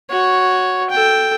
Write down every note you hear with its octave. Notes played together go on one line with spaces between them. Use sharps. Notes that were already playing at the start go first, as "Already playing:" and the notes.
F#4 C#5
A4 G5